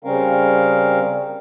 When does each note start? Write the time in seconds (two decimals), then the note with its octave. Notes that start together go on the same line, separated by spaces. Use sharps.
0.04 C#3 G3 C4 C#4 A#4 F5